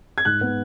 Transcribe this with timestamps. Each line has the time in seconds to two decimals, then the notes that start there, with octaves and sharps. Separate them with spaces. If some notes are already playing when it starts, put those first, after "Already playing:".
0.18 G#6
0.25 G#2 F#6
0.41 B3